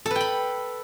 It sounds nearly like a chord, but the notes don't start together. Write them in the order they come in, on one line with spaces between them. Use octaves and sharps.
A4 B4 G5 B5